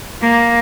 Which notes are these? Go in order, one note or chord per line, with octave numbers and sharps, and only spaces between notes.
A#3